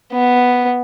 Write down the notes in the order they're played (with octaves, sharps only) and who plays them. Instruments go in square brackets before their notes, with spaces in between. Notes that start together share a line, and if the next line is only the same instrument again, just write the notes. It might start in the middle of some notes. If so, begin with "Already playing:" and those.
[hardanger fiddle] B3